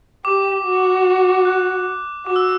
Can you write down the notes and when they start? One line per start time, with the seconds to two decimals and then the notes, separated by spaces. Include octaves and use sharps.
0.25 G4 D6
0.65 F#4
1.45 F#6
2.26 F#4 D6
2.36 E6